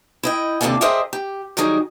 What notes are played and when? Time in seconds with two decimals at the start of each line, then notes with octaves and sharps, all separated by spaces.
0.23 E4 D#5 G5
0.61 D#2 C3 D4 A4 F5 G#5
0.81 G#4 A#4 C5 D#5 E5 G5
1.13 G4
1.57 D#3 F#3 G3 D#4 G#4 A#4